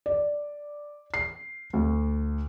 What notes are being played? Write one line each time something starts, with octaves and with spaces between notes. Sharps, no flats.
D5
C7
D2